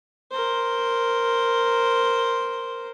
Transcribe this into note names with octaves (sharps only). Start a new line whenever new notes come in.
A#4 C5